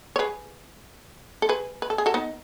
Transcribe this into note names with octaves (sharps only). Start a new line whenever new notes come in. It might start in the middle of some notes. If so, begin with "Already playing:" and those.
C#5
G#4 B4
A4
G#4 B4
B4
A4
G#4
F#4 A4
B3 D#4